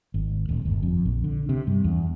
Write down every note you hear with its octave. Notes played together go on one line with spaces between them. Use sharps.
G#1
D#1
G1
F2
A#1
D3
C3
G2
E2